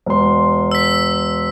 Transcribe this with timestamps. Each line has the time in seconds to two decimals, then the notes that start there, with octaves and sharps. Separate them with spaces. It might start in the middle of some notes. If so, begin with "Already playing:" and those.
0.06 E1 C6
0.71 E6 B6